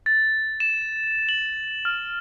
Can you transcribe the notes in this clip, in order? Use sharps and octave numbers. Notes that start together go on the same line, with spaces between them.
A6
E7
F#7
F6